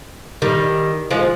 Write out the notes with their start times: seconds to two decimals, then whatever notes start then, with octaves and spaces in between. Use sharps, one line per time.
0.42 D#3 G3
1.11 F3 G#3